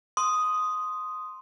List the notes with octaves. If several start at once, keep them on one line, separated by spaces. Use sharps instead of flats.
C6 D#6